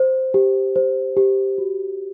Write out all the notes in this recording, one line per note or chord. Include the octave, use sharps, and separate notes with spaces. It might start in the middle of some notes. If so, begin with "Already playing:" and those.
Already playing: C5
G4
C5
G4
F#4